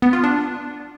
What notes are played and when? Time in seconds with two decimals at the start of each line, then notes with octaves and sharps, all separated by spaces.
0.02 B3
0.13 F4
0.24 D4